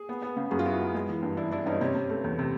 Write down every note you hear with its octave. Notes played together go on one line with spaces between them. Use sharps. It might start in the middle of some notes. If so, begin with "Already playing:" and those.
Already playing: G#4
B3
B3
C#3
F#2 F#4 G#4
F4
B3 E4 F#4
B3
G#3
E3
G2
E3 D4 E4
E3 D4 E4
G2 C#4 D#4
C3 C#4
C3
A3
E2
C3